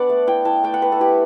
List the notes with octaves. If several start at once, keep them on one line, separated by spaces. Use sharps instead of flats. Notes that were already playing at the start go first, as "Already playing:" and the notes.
Already playing: B3 D4 D5 F#5
A3
E4 G5
E4 A5
A3 G5
F#5
A3 B4
A4
E4 G4